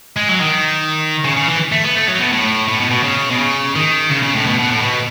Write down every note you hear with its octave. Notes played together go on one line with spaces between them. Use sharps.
G#3
F#3
D#3
C#3
C#3
E3
A3
B3
A3
F#3
B2
A2
A2
B2
B2
C#3
B2
C#3
D#3
C#3
C#3
A2
B2
B2
A2
B2